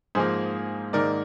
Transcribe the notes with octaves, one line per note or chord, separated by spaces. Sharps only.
G#2 F3 A#3 G#4 C5
G#2 D#3 A#3 A#4 D5